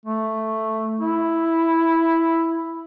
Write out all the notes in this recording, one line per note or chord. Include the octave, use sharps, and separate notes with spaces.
A3
E4